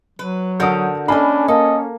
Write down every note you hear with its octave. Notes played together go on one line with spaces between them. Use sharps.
F#3 B4
D3 F#4 A#4 D#6 G6
A#3 C#4 D4 A4 D#5 G#5 B5
A#3 A4 D#5